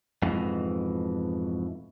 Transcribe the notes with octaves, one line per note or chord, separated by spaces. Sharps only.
F2 G#2 B2 E3